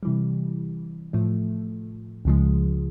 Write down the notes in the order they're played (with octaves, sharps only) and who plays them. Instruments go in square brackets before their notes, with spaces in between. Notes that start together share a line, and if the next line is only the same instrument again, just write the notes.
[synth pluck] C3 E3 G3
A2 F3 A3
C#2 C#3 F3 G#3